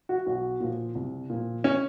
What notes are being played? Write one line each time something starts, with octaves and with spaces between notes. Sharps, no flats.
F#4
B1 F#4
A#2 F3
C2
A#2 F3
C#4